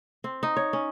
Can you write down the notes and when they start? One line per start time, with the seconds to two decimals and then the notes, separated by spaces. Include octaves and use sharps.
0.24 C4
0.43 D#4
0.57 C#5
0.73 C#4